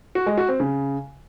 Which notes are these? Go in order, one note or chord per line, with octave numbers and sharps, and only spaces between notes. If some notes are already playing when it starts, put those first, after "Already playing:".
F#4
G#3
F#4
C4
C#3